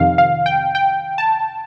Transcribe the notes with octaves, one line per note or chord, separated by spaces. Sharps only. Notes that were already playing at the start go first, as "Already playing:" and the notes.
Already playing: F2 C3 D#3 F5
F5
G5
G5
A5